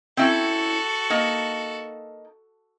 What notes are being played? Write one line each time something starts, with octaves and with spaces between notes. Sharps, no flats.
C4 C#4 E4 F#4 A4
A#3 D#4